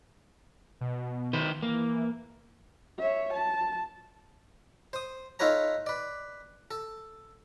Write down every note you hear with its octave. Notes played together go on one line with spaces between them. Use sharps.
B2
D#3 B4 C5
E3 A#3
C#5 E5
A5
C5 D#6
D#4 F4 A4 B4 C#5 A#5
B4 D5
A4